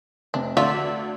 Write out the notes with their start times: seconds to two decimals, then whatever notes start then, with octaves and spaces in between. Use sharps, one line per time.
0.34 F1 C3 D4
0.57 D2 D3 F4 D5 E5